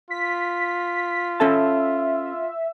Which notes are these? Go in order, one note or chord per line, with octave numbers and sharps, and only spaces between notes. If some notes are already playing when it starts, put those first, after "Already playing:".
F4 B6
C#4 A4 E5 A5